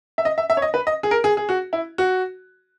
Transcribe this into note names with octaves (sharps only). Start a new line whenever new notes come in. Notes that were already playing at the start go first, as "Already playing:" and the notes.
E5
D#5
E5
E5
C#5
D#5
B4
D#5
G#4
A#4
G#4
G#4
F#4
E4
F#4